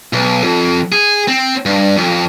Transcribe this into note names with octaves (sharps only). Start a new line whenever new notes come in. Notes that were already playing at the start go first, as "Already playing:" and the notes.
B1
F2
G#4
C4
G2
F2